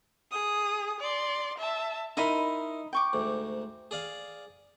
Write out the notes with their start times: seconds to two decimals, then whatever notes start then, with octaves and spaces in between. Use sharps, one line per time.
0.31 G#4 D#6
1.01 D5 C6
1.59 E5 A5
2.17 D#4 E4 A#4 D#5 B5 C6
2.93 G5 C#6 D6
3.13 D2 G#2
3.91 G#4 D5 F5